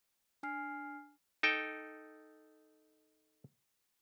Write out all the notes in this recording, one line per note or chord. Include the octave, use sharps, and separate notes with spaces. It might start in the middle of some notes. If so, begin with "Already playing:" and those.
D4 G#5 F6 C7
D#4 A4 G5